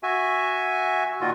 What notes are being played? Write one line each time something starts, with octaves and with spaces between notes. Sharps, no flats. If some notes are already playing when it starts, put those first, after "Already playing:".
F#4 E5 G#5
A#2 D#3 F4 F#4